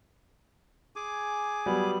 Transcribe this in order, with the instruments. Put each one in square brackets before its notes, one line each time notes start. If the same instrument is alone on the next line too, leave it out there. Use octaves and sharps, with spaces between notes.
[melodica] G#4 G#5 D6
[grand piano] F#3 G3 B3